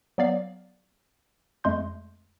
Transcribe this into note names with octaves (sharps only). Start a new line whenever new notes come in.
F#3 B3 D5 F5
F2 G#3 A3 C6 G6